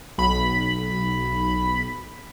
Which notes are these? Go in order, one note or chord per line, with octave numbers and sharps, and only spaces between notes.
B1 B5